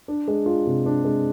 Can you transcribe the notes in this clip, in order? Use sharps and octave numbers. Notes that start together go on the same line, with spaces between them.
D4
G#3
F4
C3
D4
G#3